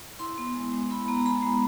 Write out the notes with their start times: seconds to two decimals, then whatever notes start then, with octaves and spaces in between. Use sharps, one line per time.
0.19 E4 C6
0.38 B3
0.55 G#3
0.73 G#3
0.90 E4 B5
1.08 B3 A#5
1.20 A#5
1.25 G#3 B5
1.43 G#3